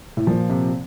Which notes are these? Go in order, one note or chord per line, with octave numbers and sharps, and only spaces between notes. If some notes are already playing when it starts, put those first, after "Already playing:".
A2
A#2 F3
C3